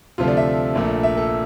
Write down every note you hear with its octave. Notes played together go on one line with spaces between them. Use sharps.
D2 C3 F3 A3 F4
D5
E5
A#1 A#2 A3
E5
A4